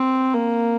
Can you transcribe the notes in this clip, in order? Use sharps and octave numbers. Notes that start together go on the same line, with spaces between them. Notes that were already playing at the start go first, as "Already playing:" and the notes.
Already playing: C4
A#3